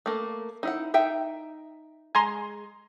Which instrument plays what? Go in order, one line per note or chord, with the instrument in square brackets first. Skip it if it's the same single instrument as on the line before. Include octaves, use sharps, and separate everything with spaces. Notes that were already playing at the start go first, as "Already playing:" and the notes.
[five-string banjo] A3 A#3
D#4 E4 F#5
D#4 E5 G5
[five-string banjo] G#3 [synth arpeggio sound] G#5 A#5 C6